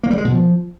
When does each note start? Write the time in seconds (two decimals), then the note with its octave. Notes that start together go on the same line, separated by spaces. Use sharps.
0.03 A#3
0.11 G3
0.18 G#3
0.25 B2
0.32 F3